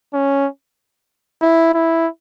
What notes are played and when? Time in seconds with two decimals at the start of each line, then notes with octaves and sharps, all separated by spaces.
0.14 C#4
1.42 E4
1.74 E4